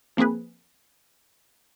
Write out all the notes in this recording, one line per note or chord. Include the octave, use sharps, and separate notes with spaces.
F3 A#3 C4 G#4 B4